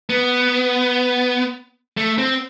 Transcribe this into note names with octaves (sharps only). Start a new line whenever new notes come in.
B3
A3
C4